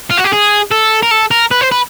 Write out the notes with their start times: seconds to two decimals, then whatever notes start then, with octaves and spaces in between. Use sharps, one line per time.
0.10 F4
0.17 F#4
0.24 G4
0.32 G#4
0.71 A4
1.03 A#4
1.11 A4
1.31 A#4
1.51 B4
1.61 C5
1.72 B4